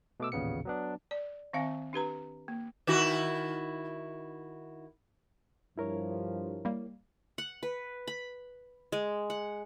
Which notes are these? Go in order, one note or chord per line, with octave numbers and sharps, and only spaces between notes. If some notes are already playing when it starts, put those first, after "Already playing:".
B2 A3 D6 E6
A1 D#2 A#2 C#3 B3 C#7
F#3 B3 D4
D5
D#3 C4 E5 F5 G#5
D4 G4 B4 A#5
A#3
D#3 E4 F#4
G2 F3 E4 A#4 C#5
G3 A#3
F#5
B4
B5
G#3
F#5